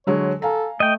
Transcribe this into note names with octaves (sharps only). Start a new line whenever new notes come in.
D3 F#3 G#3 C#5
A4 F5 G#5 A#5
A3 D#5 G5